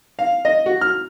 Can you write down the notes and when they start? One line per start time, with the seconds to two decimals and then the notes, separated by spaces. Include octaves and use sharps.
0.19 F5
0.45 D#5
0.66 F#4
0.81 F6